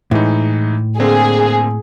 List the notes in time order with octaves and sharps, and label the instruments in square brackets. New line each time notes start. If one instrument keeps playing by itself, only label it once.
[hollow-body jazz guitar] A2 [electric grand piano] E3 G#3 D#4
[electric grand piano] D3 A#3 C4 [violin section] G#4